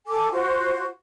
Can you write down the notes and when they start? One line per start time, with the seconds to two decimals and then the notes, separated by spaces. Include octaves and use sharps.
0.07 A4 G#5 D6
0.32 F4 F#4 C5